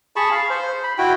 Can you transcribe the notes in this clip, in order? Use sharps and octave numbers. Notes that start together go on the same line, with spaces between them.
G#4 A5 B5 C#6
F5
C5
B5
E4 F#4 G5